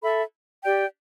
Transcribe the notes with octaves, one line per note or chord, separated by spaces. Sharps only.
A4 E5 B5
G4 D5 G5